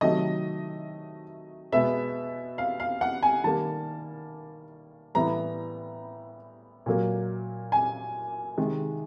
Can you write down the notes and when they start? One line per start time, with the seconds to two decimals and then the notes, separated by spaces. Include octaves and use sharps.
0.01 C3 D#3 F#3 A3 D#5
1.73 B2 G#3 B3 E5
2.58 F5
2.80 F5
3.01 F#5
3.23 G#5
3.44 D#3 G3 A#3 A5
5.15 A2 E3 G3 B3 A#5
6.86 A#2 F#3 A#3
7.72 G#5
8.57 C3 D#3 G#3